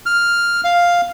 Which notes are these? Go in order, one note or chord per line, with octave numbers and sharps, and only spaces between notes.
F6
F5